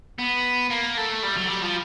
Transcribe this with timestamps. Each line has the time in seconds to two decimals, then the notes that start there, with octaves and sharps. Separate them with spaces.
0.19 B3
0.70 A#3
0.97 A3
1.23 G3
1.37 F#3
1.49 G3
1.63 F3